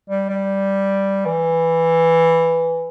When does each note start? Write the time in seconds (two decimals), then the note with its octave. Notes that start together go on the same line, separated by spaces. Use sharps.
0.09 G3
0.29 G3
1.25 E3